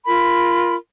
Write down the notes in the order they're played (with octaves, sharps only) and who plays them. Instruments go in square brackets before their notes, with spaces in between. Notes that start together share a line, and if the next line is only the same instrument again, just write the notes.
[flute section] F4 A#4 B5